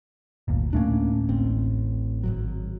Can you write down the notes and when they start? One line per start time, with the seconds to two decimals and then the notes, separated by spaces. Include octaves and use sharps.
0.48 G1 D2 A#2
0.73 D1 A3 A#3 C#4 D4
1.29 A1 C4
2.24 G#1 C#2 F#3